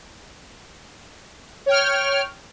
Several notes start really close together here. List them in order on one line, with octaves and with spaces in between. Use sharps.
C#5 G5 F6